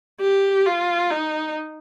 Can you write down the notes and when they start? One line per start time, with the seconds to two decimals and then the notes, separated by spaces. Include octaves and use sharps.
0.21 G4
0.66 F4
1.11 D#4